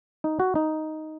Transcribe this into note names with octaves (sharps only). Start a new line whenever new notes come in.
D#4
F#4
D#4